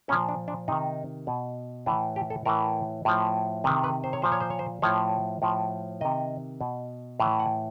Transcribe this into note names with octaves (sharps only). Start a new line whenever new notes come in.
A#2 F3 C#4
D4
D4
C3 D#3 D#4
B2
A2 E3 D4
G4
A4
A2 E3 A#4
A2 F3
C3 D#3 B4
B4
C5
C#5
A#2 F3 C5
C#5
C5
C#5
C5
A2 F3 C#5
A2 F3
C3 D#3 D#5
B2
A2 E3 F5
F#5